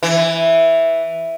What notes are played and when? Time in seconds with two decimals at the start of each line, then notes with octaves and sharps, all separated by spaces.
0.03 E3